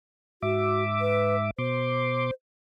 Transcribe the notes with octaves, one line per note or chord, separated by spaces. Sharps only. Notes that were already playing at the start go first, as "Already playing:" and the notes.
G#2 F#4 E5 D6
B4
B2 C5 C6 D6